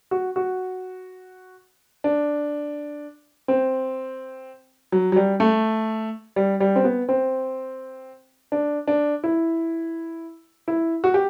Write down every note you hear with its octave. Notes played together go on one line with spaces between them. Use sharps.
F#4
F#4
D4
C4
F#3
F#3
G3
A3
G3
G3
C4
B3
C4
D4
D4
E4
E4
F#4
G4